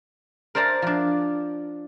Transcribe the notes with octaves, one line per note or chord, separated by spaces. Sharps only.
A#4 C5 D5 A5 A#5
F3 D4